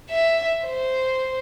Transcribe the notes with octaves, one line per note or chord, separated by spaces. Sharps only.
E5
C5